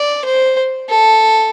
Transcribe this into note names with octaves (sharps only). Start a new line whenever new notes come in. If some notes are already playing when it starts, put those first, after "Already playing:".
Already playing: D5
C5
A4